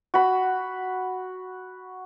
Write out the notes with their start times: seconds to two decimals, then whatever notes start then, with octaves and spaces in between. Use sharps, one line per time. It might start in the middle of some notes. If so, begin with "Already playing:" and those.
0.14 F#4 B5